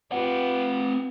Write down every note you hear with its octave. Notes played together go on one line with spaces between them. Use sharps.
C4 F4 G4 B4 F#5